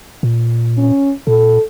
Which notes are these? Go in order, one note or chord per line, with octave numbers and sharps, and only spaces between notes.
A#2
C#4
A#2 A4